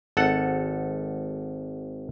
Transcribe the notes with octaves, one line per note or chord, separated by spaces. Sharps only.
G#1 A4 F#5